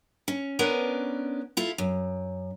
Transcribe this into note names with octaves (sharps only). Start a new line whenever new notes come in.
C#4
B3 C#4 D4 A#4 B4
E4 F4 A4
F#2